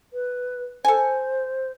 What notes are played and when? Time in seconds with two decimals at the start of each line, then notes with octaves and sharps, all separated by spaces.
0.13 B4
0.85 A4 C5 G#5